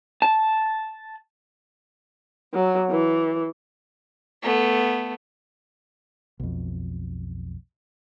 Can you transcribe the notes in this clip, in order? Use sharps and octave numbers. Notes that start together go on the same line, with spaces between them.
A5
F#3
E3
A3 B3
B1 F2